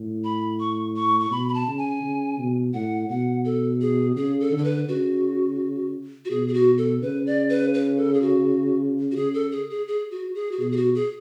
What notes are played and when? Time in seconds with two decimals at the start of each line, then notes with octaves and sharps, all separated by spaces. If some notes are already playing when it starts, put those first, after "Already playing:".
Already playing: A2
0.24 B5
0.60 C#6
0.96 C#6
1.20 C#6
1.31 B2 B5
1.48 B5
1.54 A5
1.67 C#3
1.78 G#5
2.03 C#3
2.38 B2
2.74 A2 F#5
3.10 B2 F#5
3.45 A4
3.81 G#4
4.16 C#3 G#4
4.40 A4
4.52 D3
4.58 A4
4.64 B4
4.88 C#3 F#4
6.25 F#4
6.30 B2 G#4
6.48 G#4
6.54 F#4
6.78 A4
7.02 C#3 B4
7.26 D5
7.49 B4
7.74 B4
7.97 A4
8.14 G#4
8.21 F#4
9.11 F#4
9.16 C#3 G#4
9.34 A4
9.52 G#4
9.70 G#4
9.88 G#4
10.11 F#4
10.35 G#4
10.51 F#4
10.59 B2 G#4
10.71 G#4
10.77 F#4
10.95 G#4